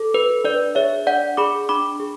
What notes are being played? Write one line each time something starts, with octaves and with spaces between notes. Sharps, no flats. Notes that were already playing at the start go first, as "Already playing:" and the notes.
Already playing: A4
F#4 B4
D4 B4 D5
G#4 C#5 E5
D4 D5 F#5
G#4 B5 D6
D4 B5 D6
G#4